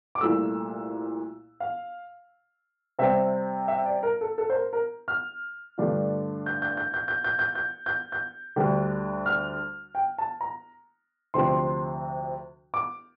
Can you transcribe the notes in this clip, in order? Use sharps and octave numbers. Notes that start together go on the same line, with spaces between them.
D6
C2 A#2 A3 E6
F5
C3 G3 C4 E5
E5
D5
A#4
A4
A4
C5
A#4
A#4
F6
G2 D3 A3 D4 F4
G6
G6
G6
G6
G6
G6
G6
G6
G6
G6
D2 D3 G3
F6
G5
A5
A#5
D2 C3 F3 C4 C6
D6